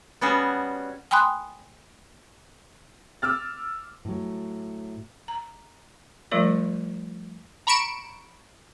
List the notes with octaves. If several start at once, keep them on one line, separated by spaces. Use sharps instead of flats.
G3 B3 C#4 F#4 G#4 A5
G5 G#5 B5 C6 D#6 F#6
D6 E6 F6 A6
A2 F#3
A#5
F3 G3 A3 F4 A#4 D5
A#5 B5 C#6 C#7 D7 E7